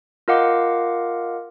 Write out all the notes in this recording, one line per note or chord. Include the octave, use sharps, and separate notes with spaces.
F4 A#4 D#5 F5 F#5 D6